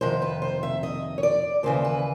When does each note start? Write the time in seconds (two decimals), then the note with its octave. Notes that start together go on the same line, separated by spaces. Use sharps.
0.01 F2 C3 D#3 C5
0.22 B4
0.42 C5
0.63 E5
0.83 D#5
1.18 C#5
1.23 D5
1.63 D#2 C#3 E3 C5
1.85 B4